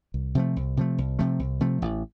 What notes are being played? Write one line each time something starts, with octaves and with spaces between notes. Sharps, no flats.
C2
C3 F3 A3
C2
C3 F3 A3
C2
C3 F3 A3
C2
C3 F3 A3
A1